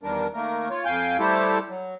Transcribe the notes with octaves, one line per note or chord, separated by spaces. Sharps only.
E2 D#3 G3 D4 A#4
D#3 A3 A#3 A#4
F4 C#5
F2 F5 G5 G#5 G6
G3 A3 E4 G4 A4 C5
F#3